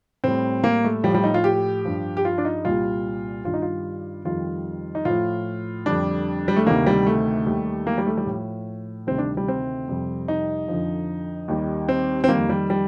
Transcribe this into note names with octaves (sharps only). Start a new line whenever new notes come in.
A2 G3 C4
A#3
A3
A2 F3 G3
G3
D#4
F4
G4
G2 F3
G4
F4
D4
D#4
C2 A#2 G3 F4
G2 D#3 G3 F4
D#4
F4
F2 D#3 G3 F4
D#4
A2 F3 F4
F2 D3 G3 D4
G3
A3
D2 C3 D#3 G3 A#3
G3
A3
D#2 D#3 G3
A#3
G3
A3
G3
A2 F3
D2 C3 D#3 G3 C4
D4
G3
C4
F2 C3 G3
D#4
F2 D3 F3
D#2 D#3 G3
C4
C4
F2 D#3 G3 A#3
G3
G3